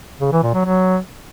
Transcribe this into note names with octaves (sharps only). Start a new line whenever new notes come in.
C#3
E3
A#2
F#3
F#3